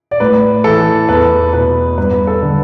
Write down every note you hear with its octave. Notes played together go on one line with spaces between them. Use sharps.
D5
A2 B4
E3 A4
E2 B4
B2 B4
G2 B4
A4
D3